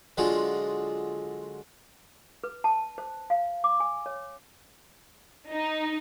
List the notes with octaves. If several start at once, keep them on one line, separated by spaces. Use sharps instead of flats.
D3 F#3 G#3 F4 G#4
B4
A5
C5
F5
D6
G#5
C#5
D#4